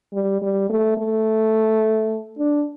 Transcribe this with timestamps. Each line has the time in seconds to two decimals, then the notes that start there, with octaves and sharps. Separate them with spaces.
0.13 G3
0.42 G3
0.70 A3
0.98 A3
2.39 D4